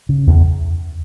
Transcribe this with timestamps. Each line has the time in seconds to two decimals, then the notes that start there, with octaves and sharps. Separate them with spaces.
0.09 C#3
0.27 E2